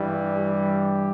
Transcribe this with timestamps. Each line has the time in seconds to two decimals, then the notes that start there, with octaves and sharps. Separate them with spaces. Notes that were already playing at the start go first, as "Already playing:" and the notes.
Already playing: G2 E3 G3
0.35 G4